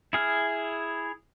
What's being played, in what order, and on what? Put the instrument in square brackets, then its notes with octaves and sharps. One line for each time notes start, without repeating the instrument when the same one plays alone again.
[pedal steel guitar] E4 G#4 F6